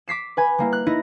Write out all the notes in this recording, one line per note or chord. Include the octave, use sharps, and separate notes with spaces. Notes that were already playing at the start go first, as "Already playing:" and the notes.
D6 B6 C7 E7
B4 G#5 B5
G3 A#3 E4
F#6
D#4 E4 D#5 A#6